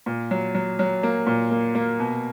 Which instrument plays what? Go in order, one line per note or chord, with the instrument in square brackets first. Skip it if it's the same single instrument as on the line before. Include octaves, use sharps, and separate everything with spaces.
[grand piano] A#2
F#3
F#3
F#3
A#3
A#2
A#3
A#3
B2